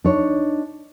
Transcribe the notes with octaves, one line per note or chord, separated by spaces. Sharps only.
D4 D#4 C#5